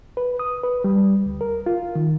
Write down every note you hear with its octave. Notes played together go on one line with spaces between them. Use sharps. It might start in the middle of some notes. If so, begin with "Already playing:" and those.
B4
D#6
B4
G3
D2
A#4
F4
D#3